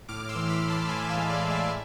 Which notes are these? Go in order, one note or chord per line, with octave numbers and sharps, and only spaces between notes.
A2 D6 F6
C6 E6
E3
B5 D6
A2
A5 C6
A2 G#5 B5
F5 A5
G#3
D5 F5
A2
E5 G#5
E5